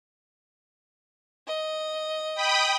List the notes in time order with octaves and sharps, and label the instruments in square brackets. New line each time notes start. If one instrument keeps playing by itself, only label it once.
[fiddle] D#5
[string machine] G5 B5 D#6